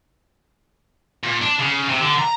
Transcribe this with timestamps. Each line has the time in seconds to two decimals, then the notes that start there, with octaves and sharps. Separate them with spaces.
1.23 A#2
1.41 D4
1.59 C#3
1.89 C3
2.00 D3
2.18 A#5